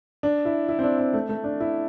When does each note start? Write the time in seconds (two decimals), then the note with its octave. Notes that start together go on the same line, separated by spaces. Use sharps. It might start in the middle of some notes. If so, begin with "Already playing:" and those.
0.23 D4
0.45 E4
0.69 E4
0.79 C4
0.84 D4
0.99 C4
1.13 A3
1.29 A3
1.44 D4
1.60 E4